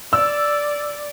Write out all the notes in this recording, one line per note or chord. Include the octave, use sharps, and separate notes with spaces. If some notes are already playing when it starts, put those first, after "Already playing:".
D5 E6